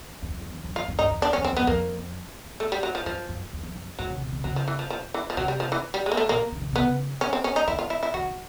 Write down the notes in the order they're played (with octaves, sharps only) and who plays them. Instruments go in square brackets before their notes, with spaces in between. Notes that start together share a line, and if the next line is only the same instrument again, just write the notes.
[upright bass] F#2
F2
F2
E2
F2
[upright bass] F#2 [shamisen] F4
[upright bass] G2
[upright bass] G2 [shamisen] D#4
[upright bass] F2
[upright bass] E2 [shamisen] D4
[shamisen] C#4
[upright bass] F2
[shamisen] C4
[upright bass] E2
[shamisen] B3
[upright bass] F#2
[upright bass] F2 [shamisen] A#3
[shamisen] A3
G3
F#3
F3
[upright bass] F#2 [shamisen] F3
[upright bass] F#2
E2
F2
F#2
[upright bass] G#2 [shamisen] F#3
[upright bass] C3
B2
C3
[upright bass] C#3 [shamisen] F#3
[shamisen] F3
E3
F3
F3
E3
F3
[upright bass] C3 [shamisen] F#3
[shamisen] G3
F3
E3
G3
G#3
A#3
A3
[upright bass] A#2 [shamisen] A#3
[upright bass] D3
C#3
[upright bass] C3 [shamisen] B3
[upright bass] C#3
[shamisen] C#4
C4
C#4
D#4
[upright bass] D3 [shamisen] E4
[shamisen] F4
E4
E4
[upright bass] D3 [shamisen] F#4
[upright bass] D#3